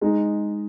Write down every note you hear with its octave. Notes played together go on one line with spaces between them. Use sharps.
G#3 D#4 G#4